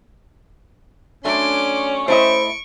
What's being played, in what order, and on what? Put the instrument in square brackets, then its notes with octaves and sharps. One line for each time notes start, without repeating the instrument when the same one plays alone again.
[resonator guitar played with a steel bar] F#3 A3 D4 [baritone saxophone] C#4 [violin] C6 D6
[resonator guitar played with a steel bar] A3 E4 D#5 [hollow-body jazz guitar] C5 [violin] C#6 D7